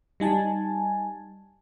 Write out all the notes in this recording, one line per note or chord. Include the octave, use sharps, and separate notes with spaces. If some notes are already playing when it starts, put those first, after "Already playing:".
G3 D#4 G#5 A5